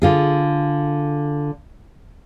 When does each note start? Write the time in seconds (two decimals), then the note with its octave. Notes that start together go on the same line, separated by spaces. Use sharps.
0.02 D3 F4 G#4